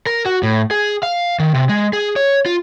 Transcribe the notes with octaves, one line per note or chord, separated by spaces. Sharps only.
A#4
F#4
A2
G#4
F5
D#3
C3
G#3
G#4
C#5
F4